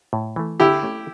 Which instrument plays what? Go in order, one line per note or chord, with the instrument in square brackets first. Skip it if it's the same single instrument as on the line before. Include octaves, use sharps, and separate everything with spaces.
[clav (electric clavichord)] A2
E3 A3
[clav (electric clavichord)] D3 [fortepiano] E4 G4
[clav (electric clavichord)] A3 C#4